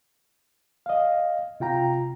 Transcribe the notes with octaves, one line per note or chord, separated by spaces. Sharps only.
D#5 F5
C3 F4 G5 A#5